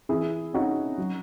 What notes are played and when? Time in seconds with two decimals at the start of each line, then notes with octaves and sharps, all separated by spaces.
0.09 E3 E4 G#4
0.53 C#4 D#4 F#4
0.98 F#3